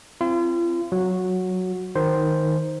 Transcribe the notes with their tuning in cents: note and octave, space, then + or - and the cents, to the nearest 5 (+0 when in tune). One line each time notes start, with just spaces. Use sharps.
C4 +0 F4 -40
F#3 +0 F#4 -10
D#3 +5 C5 +0